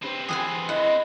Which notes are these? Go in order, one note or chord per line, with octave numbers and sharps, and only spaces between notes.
C4 C#4 G4 B4 C5
E3 G#4 A4 F#5 G#5
E4 D#5 F#5